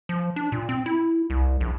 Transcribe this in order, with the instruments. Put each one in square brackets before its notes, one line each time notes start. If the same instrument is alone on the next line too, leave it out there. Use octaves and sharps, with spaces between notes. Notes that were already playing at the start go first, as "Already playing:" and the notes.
[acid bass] F3
D4
A#2
C4
E4
C2
A#1